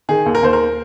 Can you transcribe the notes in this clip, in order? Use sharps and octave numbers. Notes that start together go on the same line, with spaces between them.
D#3 G#4
D#2
A#4
D#2 C5
A#4